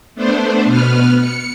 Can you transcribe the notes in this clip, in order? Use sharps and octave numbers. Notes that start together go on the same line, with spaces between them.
A3 B3 D4 C5
B2 B3 B4 F6
C#7